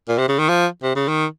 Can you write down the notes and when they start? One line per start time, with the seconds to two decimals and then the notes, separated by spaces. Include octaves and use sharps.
0.08 A#2
0.18 C3
0.28 C#3
0.39 D#3
0.49 F3
0.83 C3
0.95 C#3
1.08 D#3